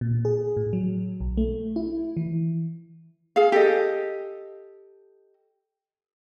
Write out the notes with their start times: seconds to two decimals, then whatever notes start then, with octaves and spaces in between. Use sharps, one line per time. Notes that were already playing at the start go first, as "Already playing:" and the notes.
0.01 A#2
0.25 G#4
0.57 A2
0.73 F#3
1.20 B1
1.37 A3
1.76 E4
2.17 E3
3.36 G#4 F5
3.52 G4 A4 D#5